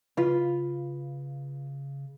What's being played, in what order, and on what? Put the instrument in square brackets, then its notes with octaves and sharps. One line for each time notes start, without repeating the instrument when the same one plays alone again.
[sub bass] C#3 [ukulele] F4 B4